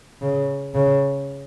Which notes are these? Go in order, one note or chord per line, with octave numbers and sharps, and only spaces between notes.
C#3
C#3